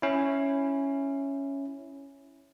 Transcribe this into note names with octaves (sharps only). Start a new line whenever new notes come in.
C#4 E4